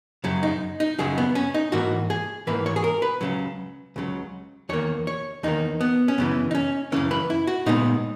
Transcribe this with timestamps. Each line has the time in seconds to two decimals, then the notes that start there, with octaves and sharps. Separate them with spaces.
0.24 F#2 C#3 F#3
0.43 D#4
0.80 D#4
0.99 F#2 C#3 F#3 G#4
1.18 B3
1.35 C#4
1.54 D#4
1.72 G#2 E3 A#3 F#4
2.10 G#4
2.47 G#2 E3 A#3 B4
2.66 C#5
2.76 G#4
2.84 A#4
3.02 B4
3.21 C#2 C#3 F#3
3.96 C#2 C#3 F#3
4.69 E2 D#3 A#3 C#5
5.07 C#5
5.43 E2 D#3 A#3 D#4
5.81 B3
6.08 C#4
6.18 F#2 C#3 E3 B3
6.51 D#4
6.55 C#4
6.92 F#2 C#3 E3 C#4
7.11 B4
7.30 E4
7.47 F#4
7.66 A#2 G#3 B3 D#4